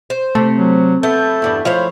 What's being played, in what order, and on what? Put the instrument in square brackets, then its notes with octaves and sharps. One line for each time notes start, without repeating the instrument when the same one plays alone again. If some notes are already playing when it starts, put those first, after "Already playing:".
[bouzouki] C5
[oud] C3 [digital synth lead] A3
[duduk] F#3
[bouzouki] A3 [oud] B3 [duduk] A4 [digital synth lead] G6
[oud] E2 G2 D4
[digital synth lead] F3 [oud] G#3 A3 E4 [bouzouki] C5 C#5 F5